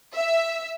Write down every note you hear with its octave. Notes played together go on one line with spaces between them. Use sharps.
E5